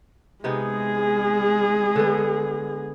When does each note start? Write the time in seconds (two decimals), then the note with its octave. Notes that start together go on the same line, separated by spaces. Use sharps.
0.44 C3 G#3 B3 D#4 G#4
1.96 D3 B3